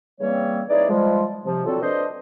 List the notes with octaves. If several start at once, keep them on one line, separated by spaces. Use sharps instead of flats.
C#3 E3 G3 A#3 C4 C#5
D#4 E4 G#4 B4 C#5 D5
F3 G3 G#3
C3 F3
D3 F#3 C4 F4 F#4 A4
D4 B4 C5 D#5